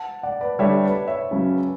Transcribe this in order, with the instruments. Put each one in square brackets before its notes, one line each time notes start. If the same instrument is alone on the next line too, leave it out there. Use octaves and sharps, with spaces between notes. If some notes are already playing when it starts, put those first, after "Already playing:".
Already playing: [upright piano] F#5 A5
D5 F#5
B4 D5
[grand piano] D3 G3 D4 G4 [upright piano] C#5 E5
[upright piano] B4 D5
C#5 E5
[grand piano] C#3 F#3 C#4